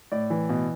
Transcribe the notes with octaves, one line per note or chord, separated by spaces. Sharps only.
A2 D5
E3
B2